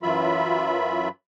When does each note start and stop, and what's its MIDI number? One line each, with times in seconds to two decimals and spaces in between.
0.03 1.09 42
0.03 1.09 52
0.03 1.09 54
0.03 1.09 65
0.03 1.09 76
0.03 1.09 83